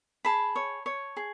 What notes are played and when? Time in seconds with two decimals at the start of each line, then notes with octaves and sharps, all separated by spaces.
0.25 G#4 A5 B5
0.56 C#5
0.86 C#5
1.17 G#4